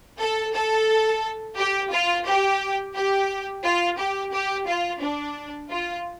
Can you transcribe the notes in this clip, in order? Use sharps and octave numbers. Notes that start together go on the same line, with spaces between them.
A4
A4
G4
F4
G4
G4
F4
G4
G4
F4
D4
F4